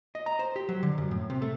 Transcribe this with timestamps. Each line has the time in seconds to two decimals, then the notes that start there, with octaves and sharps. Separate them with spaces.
0.15 D#5
0.26 A#5
0.39 C5
0.56 G4
0.69 F#3
0.83 D3
0.98 F#2
1.11 A2
1.30 C3
1.42 A3